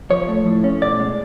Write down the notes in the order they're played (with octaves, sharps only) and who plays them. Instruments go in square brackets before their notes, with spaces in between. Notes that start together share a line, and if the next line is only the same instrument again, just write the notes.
[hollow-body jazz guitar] F3 C#5
A3
A2
C#4
B2 D5
G#3